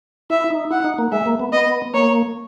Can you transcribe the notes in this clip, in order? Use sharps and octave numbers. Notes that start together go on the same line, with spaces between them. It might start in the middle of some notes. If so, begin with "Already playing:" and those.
E4 E5
D#4
E4 F#5
D#4
A#3
G#3 E5
A#3
B3
B3 D#5
A#3 C#5